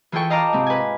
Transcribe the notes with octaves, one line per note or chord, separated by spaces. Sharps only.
E3 F4 G#4 A4 G5 C#6
D#5 F5 A5 A#5 D6 F6
G#2 C3 C4
B4 G#5